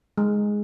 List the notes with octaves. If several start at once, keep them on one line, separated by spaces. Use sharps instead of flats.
G#3